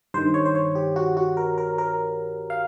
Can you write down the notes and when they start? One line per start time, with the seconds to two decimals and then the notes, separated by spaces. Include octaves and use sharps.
0.14 G2 D#3 C5
0.34 C#5
0.46 C5
0.55 C#5
0.75 G4
0.96 F#4
1.17 F#4
1.37 A#4
1.58 A#4
1.78 A#4
2.50 F5